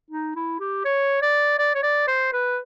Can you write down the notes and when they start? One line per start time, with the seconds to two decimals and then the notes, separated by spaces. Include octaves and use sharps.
0.10 D#4
0.36 E4
0.59 G4
0.84 C#5
1.22 D5
1.58 D5
1.75 C#5
1.83 D5
2.07 C5
2.33 B4